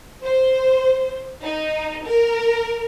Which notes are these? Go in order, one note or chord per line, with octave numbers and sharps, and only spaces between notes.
C5
D#4
A#4